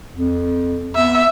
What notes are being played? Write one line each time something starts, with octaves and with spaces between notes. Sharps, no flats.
F2
B3 E5